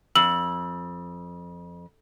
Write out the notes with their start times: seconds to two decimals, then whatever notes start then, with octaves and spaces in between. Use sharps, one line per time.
0.15 F2 E6 F#7